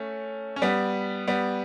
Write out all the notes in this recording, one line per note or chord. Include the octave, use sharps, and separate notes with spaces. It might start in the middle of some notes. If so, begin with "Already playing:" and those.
Already playing: A3 C#4
C#4
G3 B3
G3 B3